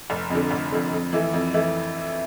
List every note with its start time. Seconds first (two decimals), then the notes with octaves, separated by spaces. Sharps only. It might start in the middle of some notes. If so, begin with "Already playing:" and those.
0.10 F1
0.30 F2 D3
0.51 F1
0.72 F2 D3
0.93 F2
1.13 E3 A3 E4
1.33 F2
1.54 E3 A3 E4